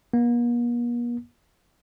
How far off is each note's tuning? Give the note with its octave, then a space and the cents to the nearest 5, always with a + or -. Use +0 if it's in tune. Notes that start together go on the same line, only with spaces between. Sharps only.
A#3 +45